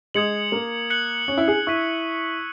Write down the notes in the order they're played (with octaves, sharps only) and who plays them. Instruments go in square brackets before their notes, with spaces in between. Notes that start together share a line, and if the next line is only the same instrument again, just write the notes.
[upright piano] G#3 [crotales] D#6 G#6 C#7 F#7
[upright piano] A#3
[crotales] F#6 C#7 F#7
[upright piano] C#4
E4
G#4
[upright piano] E4 [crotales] C#6 E6 G#6 B6 D#7